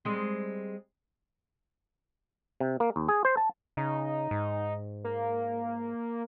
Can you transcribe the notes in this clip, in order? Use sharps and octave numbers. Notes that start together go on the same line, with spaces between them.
G3 G#3 C4
C3
A#3
D#2
G#4
C5
A5
C#3 D#4
G#2
A#3